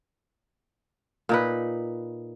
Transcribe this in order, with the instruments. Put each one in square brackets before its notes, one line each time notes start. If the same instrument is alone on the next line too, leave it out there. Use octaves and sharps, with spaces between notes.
[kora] A#2 D#4 B4